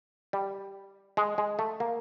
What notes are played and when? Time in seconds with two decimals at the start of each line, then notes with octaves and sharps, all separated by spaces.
0.33 G3
1.17 G#3
1.38 G#3
1.59 A3
1.80 A#3